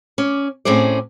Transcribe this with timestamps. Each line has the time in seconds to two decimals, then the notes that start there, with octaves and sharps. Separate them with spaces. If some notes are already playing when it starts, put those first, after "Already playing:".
0.18 C#4 D5
0.65 A2 C4 C#4 G#4 C5 D5